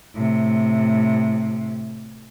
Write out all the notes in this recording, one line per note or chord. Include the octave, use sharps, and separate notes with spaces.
A2 C3